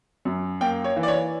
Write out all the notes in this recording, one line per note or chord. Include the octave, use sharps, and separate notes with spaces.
F#2
A#3 G5
C#5
E3
D5
C#5